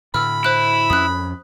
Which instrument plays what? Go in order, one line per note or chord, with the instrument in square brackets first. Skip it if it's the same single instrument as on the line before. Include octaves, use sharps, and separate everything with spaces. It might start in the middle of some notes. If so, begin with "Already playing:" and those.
[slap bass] A2 D3 [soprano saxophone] B5 [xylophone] E6 F6
[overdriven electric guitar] E4 [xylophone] C5 F#6
[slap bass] F2 C#4 [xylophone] D#6 F#6